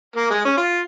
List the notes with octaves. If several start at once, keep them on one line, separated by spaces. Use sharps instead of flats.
A#3
G#3
C#4
F4